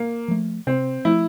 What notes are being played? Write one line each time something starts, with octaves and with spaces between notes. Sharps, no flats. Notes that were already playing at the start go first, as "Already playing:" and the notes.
Already playing: A#3
F3 A3
C3 C4
F3 A3 E4